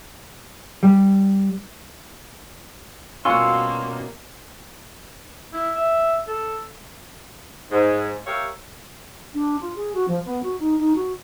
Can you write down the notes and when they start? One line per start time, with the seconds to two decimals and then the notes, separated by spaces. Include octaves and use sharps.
0.83 G3
3.25 B2 G3 A#3 C#4 F4 F#4 C6 E6
5.53 E4
5.75 E5
6.27 A4
7.71 G#2
8.26 G4 A#4 C#5 E5 F5
9.34 D4
9.60 F4
9.76 G#4
9.94 F#4
10.08 F3
10.25 B3
10.43 F#4
10.60 D#4
10.79 D#4
10.95 F#4